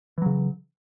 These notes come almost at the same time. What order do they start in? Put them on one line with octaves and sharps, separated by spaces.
E3 F#3 C#3